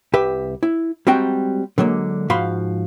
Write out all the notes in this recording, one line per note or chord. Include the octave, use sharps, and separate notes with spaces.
C2 G4 B4 E5
E4
G3 G#3 C4 F#4 G5 A#5
D3 F#3 G#3 A#3
G#2 F3 F#4 F5 B5 C6